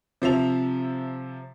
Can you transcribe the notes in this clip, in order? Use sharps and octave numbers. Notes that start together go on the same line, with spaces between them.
C3 F3 E5 F7